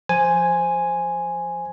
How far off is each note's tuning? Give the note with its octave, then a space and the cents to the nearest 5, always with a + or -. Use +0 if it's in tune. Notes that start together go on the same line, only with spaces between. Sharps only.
F3 +0 C5 +0 G#5 +0